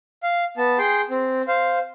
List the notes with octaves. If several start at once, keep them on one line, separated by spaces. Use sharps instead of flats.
F5
B3 A5
G#4 G5 C6
C4
C5 F5